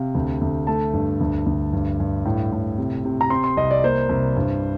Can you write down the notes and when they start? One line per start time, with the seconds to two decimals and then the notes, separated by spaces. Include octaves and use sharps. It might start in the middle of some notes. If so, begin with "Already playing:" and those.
Already playing: C3 F5
0.15 D2
0.41 D2
0.67 A3 A5
0.93 G2
1.21 D2
1.46 D2
1.73 G2
2.00 G2
2.25 A2
2.52 A2
2.78 C3
3.05 C3
3.21 A#5
3.30 C4 C6
3.44 C6
3.57 C2 D#5
3.71 D5
3.84 A#3 C5
4.09 C2
4.37 G2